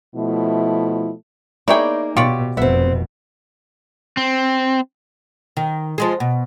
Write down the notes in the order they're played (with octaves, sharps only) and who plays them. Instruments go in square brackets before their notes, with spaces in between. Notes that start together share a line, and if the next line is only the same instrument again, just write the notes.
[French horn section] B2 F3 A3 E4
[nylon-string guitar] A#3 D#4 E5 [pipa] E4 C#5 G5 [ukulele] G#4 D5
[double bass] B2 [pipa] F4 C#5 D5 [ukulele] G4
[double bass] F1 B2 [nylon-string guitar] B3 C4 [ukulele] E5
[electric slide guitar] C4
[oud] D#3
F3 G#3 G#4
B2